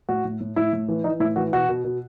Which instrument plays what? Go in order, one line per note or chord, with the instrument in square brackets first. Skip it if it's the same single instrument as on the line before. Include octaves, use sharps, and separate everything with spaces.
[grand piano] A2 F#4
A2
A2
A2 E4
A2
E3
E3 D#4
A2 E4
E3 F#4
B2 F#4
B2
B2